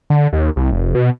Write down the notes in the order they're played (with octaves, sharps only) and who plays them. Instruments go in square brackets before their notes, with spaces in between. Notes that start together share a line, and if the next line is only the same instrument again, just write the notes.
[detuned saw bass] D3
D#2
C2
F1
B2